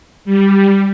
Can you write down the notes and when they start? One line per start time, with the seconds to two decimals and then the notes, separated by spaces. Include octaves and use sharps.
0.25 G3